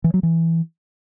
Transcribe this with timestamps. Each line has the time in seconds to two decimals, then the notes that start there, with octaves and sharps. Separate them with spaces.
0.04 E3
0.14 F#3
0.23 E3